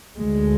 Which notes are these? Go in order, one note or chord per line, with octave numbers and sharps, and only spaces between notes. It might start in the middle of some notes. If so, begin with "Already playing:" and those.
D2 G#3